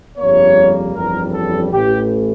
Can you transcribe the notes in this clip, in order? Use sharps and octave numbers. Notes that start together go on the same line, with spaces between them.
G1 F2 C#3 G3 A#3 C#5
G1 F2 C#3 E3 G3 A#4
A4
A1 A2 E3 A3 G4